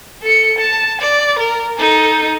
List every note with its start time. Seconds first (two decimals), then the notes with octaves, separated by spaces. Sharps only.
0.22 A4 C#7
0.58 A5
1.01 D5
1.38 A#4
1.77 D#4 A4